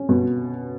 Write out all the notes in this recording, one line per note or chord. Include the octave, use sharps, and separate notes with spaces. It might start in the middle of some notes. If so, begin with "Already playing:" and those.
Already playing: C#4
B2